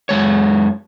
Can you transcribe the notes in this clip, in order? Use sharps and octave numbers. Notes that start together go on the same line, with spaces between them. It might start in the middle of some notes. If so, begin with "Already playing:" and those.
F#2 G#3 C#5